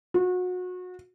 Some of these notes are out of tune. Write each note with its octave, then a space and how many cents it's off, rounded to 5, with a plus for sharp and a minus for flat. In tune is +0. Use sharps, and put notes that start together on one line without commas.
F#4 -30